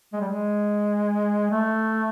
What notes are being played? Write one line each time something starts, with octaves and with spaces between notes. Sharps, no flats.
G#3
G3
G#3
A3